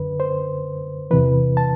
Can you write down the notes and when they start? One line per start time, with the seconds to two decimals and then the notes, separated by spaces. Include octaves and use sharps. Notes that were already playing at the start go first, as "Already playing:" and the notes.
Already playing: F#2 D3 B4
0.20 C5
1.11 E2 C3 E3 B4
1.57 A5